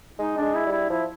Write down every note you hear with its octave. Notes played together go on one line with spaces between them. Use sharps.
G#3 D#4
G#3 D4
E4
G3 E4
F3 E4